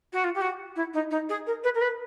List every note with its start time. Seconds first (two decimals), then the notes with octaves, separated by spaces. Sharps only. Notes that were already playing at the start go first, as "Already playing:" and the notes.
0.12 F#4
0.24 F4
0.34 G4
0.41 F#4
0.76 E4
0.93 D#4
1.10 D#4
1.29 G#4
1.46 A#4
1.63 B4
1.74 A#4
1.81 B4